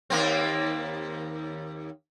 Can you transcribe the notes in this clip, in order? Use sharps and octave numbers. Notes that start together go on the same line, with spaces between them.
D#2 A#3 C4